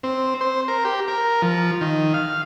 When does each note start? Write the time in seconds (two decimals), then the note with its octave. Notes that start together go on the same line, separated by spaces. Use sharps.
0.03 C4
0.41 C5
0.68 A#4
0.85 G4
1.08 A#4
1.42 F3
1.81 D#3
2.14 F5